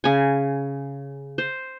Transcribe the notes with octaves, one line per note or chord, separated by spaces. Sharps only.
C#3 G#5
C5